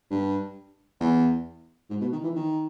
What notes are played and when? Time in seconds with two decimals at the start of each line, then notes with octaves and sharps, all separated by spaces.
0.10 G2
1.00 E2
1.90 G#2
2.01 B2
2.12 D#3
2.23 E3
2.35 D#3